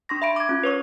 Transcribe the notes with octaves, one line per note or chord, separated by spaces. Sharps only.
D4 C6 C#6 A#6
E5 B5 D7
D6 G#6
C#4 F4
B4 C#5 C#6